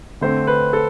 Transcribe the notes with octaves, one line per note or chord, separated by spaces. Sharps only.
D3 A3 C4 C5
B4
A4